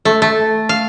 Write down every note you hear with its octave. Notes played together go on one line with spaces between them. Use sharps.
A3
A3
F5